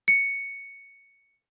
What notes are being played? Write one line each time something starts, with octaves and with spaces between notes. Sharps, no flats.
C#7